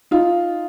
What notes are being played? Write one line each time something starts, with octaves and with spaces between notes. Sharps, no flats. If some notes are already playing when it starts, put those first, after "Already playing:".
D#4 F4